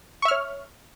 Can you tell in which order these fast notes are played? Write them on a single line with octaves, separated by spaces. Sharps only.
C#6 E5 F6 C#5